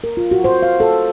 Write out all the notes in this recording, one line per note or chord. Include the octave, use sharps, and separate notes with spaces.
A#4
F4
F#4
C5
F5
A4